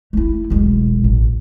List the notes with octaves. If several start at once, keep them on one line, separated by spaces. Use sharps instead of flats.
A3 E4
E1 B1
A1